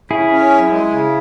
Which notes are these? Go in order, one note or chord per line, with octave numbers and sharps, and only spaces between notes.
C#3 E4 G#4
C#4
F#2
G#3
C#3